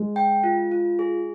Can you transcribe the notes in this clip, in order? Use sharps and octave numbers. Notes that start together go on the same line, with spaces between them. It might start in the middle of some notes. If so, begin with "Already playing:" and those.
Already playing: G#3
G5
F4
F4
G#4